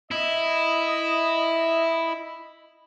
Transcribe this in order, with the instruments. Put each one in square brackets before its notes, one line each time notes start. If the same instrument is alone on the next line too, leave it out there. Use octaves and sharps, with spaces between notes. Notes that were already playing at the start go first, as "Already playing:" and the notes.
[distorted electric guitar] E4 [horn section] D#5